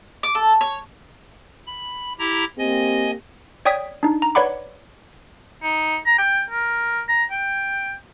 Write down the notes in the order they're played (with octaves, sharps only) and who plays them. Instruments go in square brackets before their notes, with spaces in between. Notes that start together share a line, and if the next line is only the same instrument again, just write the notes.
[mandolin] D6
A4
C#5
[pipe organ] B5
E4 G4 A#5
[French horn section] A#3 C4 G4 [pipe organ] D#5 G#5
[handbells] C#5 D5 G5 D#6 G#6 B6
D4 D#4
A#5
B4 C#5 D5 F#5 B5 D6
[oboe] D#4
A#5
G5
A#4
A#5
G5